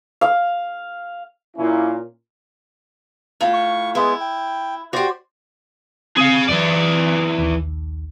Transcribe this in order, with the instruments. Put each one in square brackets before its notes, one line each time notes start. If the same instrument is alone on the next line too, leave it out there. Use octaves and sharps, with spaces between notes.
[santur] F5
[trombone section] A#2 A#3 C#4 E4
[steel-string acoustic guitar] A2 F4
[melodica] C#6
[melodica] G#3 B3 [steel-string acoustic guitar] E4
[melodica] G5
[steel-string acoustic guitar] F#4 G4 [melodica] C5 D5
[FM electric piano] C4 [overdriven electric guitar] G#4 F5
[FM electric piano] F#2 [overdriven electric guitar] E3 D5
[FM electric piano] A#1 D#2